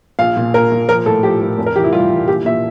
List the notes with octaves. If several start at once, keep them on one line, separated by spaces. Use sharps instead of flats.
A#1 F5
A#2
A#1 A#4
A#2
F3 A#4
A2 A4
F3 G4
A2
F1
A#4
E3 G4
E4
G3 F4
E3
A#1 G4
A#2 E5